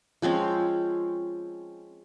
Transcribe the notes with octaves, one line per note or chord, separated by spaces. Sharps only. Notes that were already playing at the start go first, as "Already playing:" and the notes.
F3 G#3 C4 C#4